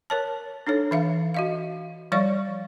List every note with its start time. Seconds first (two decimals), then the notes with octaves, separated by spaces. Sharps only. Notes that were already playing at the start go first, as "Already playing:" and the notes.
0.10 A#4 C#5 A5
0.67 D4 D#4 A4 C#5
0.91 E3 E5 F5
1.34 F#4 D#5 F5
2.12 F3 G3 C#5 D5 F5 C#6